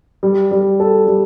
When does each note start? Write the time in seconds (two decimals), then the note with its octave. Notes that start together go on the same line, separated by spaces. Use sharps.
0.23 G3
0.51 G3
0.80 A4
1.07 G3